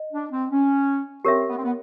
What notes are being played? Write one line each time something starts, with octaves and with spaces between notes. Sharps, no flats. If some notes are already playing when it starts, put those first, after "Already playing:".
Already playing: D#5
D4
C4
C#4
C4 G4 A#4 C#5 E5
B3
C4
B3